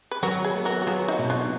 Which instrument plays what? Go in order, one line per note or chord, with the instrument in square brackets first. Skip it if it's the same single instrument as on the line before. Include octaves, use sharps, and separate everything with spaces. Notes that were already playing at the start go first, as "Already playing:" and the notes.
[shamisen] B4
[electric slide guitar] F#3 [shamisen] F#4 A#4
[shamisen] G#4 B4
[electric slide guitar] B3
[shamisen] F#4 A#4
F#4
[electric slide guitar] F#3 [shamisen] F4 G#4
[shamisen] D#4 F#4
[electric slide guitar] B2
[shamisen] D4 F4